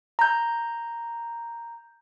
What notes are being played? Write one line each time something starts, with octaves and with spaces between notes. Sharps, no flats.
A#5 G6